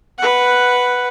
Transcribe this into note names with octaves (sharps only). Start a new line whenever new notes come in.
B4 F#5